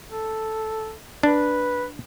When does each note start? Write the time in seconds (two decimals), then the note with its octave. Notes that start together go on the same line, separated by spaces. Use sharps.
0.09 A4
1.23 D4 B4